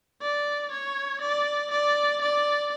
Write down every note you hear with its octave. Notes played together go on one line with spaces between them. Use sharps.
D5
C#5
D5
D5
D5